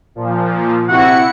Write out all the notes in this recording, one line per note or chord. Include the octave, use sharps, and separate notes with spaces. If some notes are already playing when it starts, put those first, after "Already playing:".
A#2 F3
C3 E4 F#4 F#5 C#7